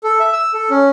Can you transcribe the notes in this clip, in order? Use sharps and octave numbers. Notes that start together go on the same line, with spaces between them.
A4
E5
E6
A4
C#4